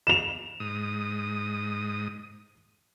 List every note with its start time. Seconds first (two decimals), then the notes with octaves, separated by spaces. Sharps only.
0.07 E7 F7
0.60 G#2 D#6